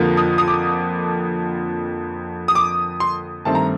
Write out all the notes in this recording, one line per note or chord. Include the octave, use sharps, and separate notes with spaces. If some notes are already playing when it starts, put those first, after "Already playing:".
Already playing: F2 D3 F3 A#3
D#6
D#6
D6
D#6
D6
C6
G2 D#3 A3 C4 A5
A#5